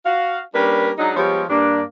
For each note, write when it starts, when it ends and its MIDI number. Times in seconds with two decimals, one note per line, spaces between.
0.05 0.39 66
0.05 0.39 77
0.54 0.90 55
0.54 0.90 58
0.54 0.90 61
0.54 0.90 62
0.54 0.90 70
0.54 0.90 71
0.98 1.16 54
0.98 1.16 56
0.98 1.16 62
0.98 1.16 63
1.17 1.43 53
1.17 1.43 55
1.17 1.43 56
1.17 1.43 59
1.17 1.43 67
1.17 1.43 73
1.50 1.82 43
1.50 1.82 58
1.50 1.82 62